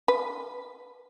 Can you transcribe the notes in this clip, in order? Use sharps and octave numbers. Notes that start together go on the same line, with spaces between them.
B4